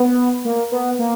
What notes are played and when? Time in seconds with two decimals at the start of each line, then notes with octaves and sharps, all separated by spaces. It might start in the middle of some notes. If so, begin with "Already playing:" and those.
Already playing: B3
0.45 A#3
0.72 B3
0.99 A#3